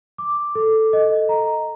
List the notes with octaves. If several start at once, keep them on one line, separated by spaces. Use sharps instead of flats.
D6
A4
D#5
A#5